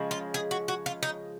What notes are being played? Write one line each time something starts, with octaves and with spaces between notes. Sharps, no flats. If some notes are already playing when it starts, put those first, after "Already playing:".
Already playing: C#3 F3 G#3
F4
G#4
F#4
F#4
F4
D#4